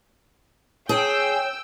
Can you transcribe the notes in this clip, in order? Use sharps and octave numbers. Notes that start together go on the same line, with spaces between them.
G#4 C#5 G5 E6